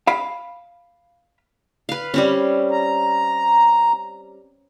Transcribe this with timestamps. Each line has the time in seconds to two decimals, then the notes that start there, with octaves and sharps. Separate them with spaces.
0.07 F5 B5
1.89 B4 F5
2.14 G3 C4 C#4
2.71 A#5